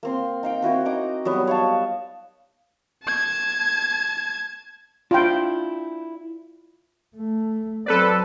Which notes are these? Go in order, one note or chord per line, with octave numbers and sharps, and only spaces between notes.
A#3 C4 C6
D#4 F5 G5
C4 E4 F#4 B4
D#4 D#5 A#5 D6
F#3 G3 B3
C#5 D#5 F5 A5
A5 G#6
D4 E4 F4 G5
A3
F#3 C4 A4 B4 D5